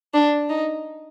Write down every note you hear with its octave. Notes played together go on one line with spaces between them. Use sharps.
D4
D#4